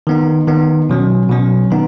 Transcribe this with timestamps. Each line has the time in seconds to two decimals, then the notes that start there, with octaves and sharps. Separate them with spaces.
0.07 D#3 B3 D#4
0.48 D#3 B3 D#4
0.89 B2 F#3 C#4
1.29 B2 F#3 C#4
1.70 D#3 B3 D#4